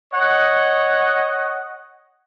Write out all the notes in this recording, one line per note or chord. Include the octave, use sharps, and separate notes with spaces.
C#5 D#5 F#5